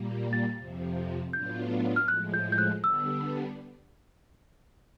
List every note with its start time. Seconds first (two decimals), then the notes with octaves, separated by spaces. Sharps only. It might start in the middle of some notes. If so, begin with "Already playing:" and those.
Already playing: A#2 G3 A#3
0.33 A6
0.58 F2 C3 F3
1.33 A2 F#3 B3 D4 F4 G6
1.96 F6
2.08 A2 F3 G#3 F#6
2.34 G6
2.52 G6
2.58 F#6
2.84 D3 G3 B3 D4 E6